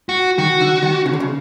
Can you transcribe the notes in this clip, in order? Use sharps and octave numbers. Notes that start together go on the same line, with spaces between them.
F#4
D#3 F#4
D3
D#3
C#3
D3
C#3